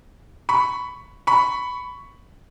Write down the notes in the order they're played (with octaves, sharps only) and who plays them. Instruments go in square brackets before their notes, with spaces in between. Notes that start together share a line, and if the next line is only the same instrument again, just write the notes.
[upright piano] B5 C#6
B5 C#6